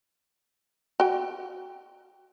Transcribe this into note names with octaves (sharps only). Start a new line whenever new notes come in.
F#4 G5